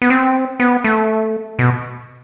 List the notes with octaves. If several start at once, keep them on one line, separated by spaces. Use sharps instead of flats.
B3
C4
B3
A3
B2